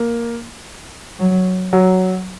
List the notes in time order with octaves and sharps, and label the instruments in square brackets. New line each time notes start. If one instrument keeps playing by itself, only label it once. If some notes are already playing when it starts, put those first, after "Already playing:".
Already playing: [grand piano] A#3
[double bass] F#3
[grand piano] F#3